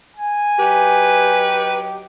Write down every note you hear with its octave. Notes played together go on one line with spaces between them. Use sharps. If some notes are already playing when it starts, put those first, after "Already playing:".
G#5
F#3 D#4 G4 B4